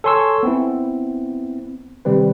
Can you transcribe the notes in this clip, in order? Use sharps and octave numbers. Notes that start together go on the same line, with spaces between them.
A4 C#5 G#5 C6 C#6 E6
B3 C4 E4
C3 D#3 G3 C4 B4